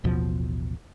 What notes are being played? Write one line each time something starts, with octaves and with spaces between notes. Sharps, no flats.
A1 D#2 B2 F3